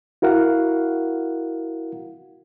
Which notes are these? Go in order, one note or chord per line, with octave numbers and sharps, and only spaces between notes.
E4 F#4 A#4 F5 F#5